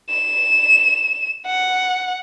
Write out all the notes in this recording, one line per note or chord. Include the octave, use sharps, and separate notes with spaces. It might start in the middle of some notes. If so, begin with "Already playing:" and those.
E7
F#5